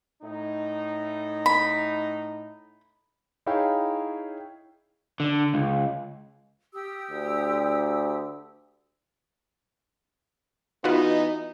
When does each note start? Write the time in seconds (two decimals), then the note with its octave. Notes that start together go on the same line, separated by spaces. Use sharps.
0.22 A2 D#4
1.46 B5
3.46 D#4 E4 G#4 C#5 F5 G5
5.20 D3
5.54 C#2
6.73 G4 D#6 E6
7.11 D2
10.84 E3 B3 D#4 F4 F#4 B4